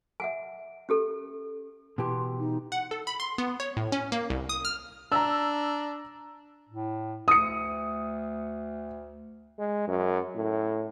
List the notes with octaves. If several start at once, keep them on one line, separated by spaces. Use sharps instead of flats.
E5 F#5 G#5
C#4 G4 A4
B2 E3 G4 C6
D#4
F#5
A4
B5
C6
B3
C#5
A2
C#4
A#3
C2
D#6
F6
D4 A#5 E6
A2
D2 D#6 C#7
G#3
F#2
A2